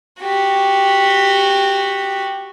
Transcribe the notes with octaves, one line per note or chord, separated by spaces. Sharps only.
F#4 G4